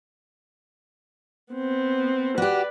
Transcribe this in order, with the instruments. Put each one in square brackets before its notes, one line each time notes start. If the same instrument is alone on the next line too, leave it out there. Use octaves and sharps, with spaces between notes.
[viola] B3 C4
[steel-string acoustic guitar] F#4 G4 [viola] B4 D5